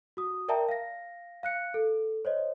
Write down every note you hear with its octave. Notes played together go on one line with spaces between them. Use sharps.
F#4 D#6
A#4 D5 E5 G5 A5 A#5
F5 A#6
F5 F#6 C#7
A4
C5 C#5 D#5